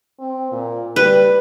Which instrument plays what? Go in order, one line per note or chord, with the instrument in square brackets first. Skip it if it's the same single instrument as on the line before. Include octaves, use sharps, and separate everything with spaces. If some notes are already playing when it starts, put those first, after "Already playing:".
[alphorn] C4
A#2
[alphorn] G3 [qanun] B4